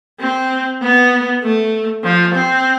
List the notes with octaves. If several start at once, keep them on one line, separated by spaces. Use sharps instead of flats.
C4
B3
A3
F3
C4